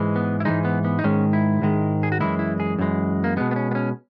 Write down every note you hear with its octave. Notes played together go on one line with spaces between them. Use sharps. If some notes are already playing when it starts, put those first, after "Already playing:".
Already playing: G#2 E3 G#3
B3
E4
G#2 E3 G#3 D#4
B3
B3
D#4
G#2 D#3 G#3 C#4
E4
G#2 D#3 G#3
G#4
F#4
F#2 E3 G#3 E4
E4
G#4
F#2 E3 G#3
A#3
B2 G#3 B3
B3
C#4
B3
C#4